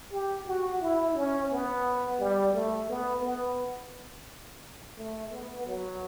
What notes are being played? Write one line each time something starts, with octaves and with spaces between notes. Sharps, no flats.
G4
F#4
E4
C#4
B3
G3
A3
B3
B3
A3
B3
F#3